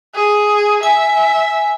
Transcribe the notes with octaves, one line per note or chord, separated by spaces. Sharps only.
G#4
E5 G#5